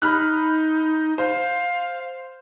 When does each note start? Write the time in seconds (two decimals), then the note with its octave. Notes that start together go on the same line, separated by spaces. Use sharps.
0.02 D#4 B5 F6 F#6
1.18 C5 F5